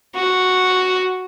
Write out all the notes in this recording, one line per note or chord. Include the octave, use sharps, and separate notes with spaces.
F#4